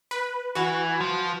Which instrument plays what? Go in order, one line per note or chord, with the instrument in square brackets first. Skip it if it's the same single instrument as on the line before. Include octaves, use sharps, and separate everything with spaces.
[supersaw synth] B4
[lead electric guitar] E3 [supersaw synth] F#4
[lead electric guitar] F3